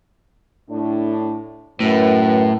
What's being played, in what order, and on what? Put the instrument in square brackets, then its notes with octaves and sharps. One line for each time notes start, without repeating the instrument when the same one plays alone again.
[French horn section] A2 D4
[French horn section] F#2 B4 [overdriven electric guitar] A2